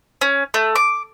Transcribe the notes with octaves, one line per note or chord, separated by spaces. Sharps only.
C#4
A3
D6